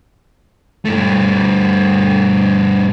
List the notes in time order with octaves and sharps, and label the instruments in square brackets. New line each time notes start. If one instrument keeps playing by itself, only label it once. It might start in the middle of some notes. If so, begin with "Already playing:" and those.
[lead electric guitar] G2 A3